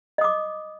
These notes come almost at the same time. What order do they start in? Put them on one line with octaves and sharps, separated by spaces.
D#5 D#6 D6